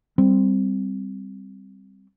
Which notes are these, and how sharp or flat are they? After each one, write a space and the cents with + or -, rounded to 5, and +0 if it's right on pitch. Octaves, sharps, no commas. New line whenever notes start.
G3 +0 C4 +0